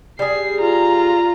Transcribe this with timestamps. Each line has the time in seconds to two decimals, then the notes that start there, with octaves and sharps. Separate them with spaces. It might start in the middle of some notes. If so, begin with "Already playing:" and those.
0.19 G3 G#4 C7
0.61 F4 A#5